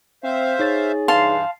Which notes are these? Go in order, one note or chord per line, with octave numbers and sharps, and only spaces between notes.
C4 C5 E5 F5
D#4 G#4 C#5 A6
G2 E3 F5 A5 C6